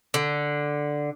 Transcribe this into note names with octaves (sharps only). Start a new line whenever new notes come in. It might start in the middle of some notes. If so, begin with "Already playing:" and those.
D3